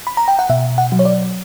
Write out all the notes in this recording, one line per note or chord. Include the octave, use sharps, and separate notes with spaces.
B5
A#5
G5
F#5
B2 E5
F#5
F#3
C#5
D5